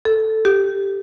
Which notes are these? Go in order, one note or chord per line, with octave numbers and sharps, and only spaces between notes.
A4
G4